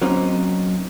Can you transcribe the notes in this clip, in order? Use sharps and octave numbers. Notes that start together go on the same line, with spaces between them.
F#3 A#3 C4 C#4 D#4